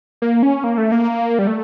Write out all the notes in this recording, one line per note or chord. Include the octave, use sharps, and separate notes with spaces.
A#3
C#4
A#3
A3
A#3
G3
A3